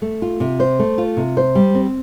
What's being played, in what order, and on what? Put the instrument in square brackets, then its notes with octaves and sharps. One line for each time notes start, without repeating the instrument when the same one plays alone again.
[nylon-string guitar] A3
F4
C3
C5
A3
F4
C3
C5
G3
C4